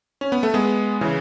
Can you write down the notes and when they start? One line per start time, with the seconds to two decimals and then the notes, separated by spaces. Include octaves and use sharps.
0.21 C#4
0.32 B3
0.43 A3
0.54 G#3 B3
1.01 C#3 E3